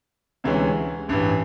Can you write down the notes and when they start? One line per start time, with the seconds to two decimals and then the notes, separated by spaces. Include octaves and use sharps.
0.44 D2 C3 E3 G#3 C#4
1.08 A1 G2 E3